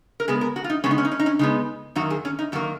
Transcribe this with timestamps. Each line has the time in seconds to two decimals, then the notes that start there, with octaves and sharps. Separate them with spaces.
0.20 A#4
0.28 C#3 G#3 B3 G#4
0.41 A#4
0.56 F#4
0.64 F4
0.70 D#4
0.84 C#3 G#3 B3 C#4
0.91 D#4
0.98 C#4
1.05 D#4
1.12 C#4
1.19 D#4
1.26 C#4
1.39 C#3 G#3 B3 D#4
1.95 F#2 D#3 A#3 F#4
2.10 G#4
2.25 C#4
2.39 D#4
2.52 F#2 D#3 A#3 F#4